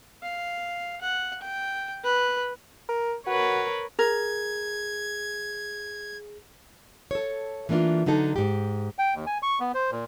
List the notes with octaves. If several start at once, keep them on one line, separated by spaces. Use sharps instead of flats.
F5
F#5
G5
B4
A#4
F#4 A#4 B4 C#5
G#4 A#4 G#6
A4 C#5
E3 A3 A#3 D4 F4
D3 F#3 D#4 A4
G#2 G4
G5
D#2
G#5
C#6
B3
C5
A#2